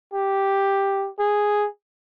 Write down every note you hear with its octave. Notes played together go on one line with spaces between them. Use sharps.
G4
G#4